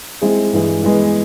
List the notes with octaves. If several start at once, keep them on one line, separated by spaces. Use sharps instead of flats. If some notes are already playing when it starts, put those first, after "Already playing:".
G#3 C4 E4 G#4
G2 E3 G#3
E3 G#3 B3